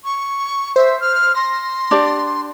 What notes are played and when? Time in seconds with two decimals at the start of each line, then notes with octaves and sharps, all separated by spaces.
0.04 C#6
0.76 C5 E5
1.00 F6
1.35 C6 A#6
1.91 D4 G4 D5